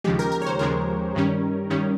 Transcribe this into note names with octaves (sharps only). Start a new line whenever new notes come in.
D#2 C#3 F3 G#3 G4
A#4
A#4
C#5
C5
D#2 C#3 F3 G#3 A#4
G2 D#3 G3 C#4
G2 D#3 G3 C#4